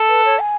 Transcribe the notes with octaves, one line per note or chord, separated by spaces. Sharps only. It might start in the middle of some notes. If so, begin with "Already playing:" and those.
Already playing: A4
B4
C#5
G#5